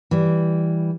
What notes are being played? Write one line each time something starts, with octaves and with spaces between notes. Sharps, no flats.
E3 G3